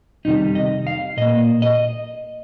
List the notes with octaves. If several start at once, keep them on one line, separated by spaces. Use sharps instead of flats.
F2 C3 D#3 G3 D#4
D#5
F5
A#2 A#3 D#5
D#5